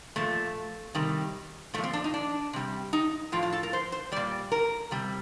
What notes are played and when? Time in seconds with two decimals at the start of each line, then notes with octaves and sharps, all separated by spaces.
0.16 A#2 F3 A3
0.95 C3 D#3 G3
1.74 A#2 A3
1.78 F3
1.83 C4
1.93 D4
2.04 D#4
2.14 D4
2.53 C3 G3
2.93 D#4
3.32 A2 F3 F4
3.43 F4
3.53 A4
3.63 A#4
3.73 C5
3.92 C5
4.12 A#2 G3 D5
4.52 A#4
4.91 C3 G3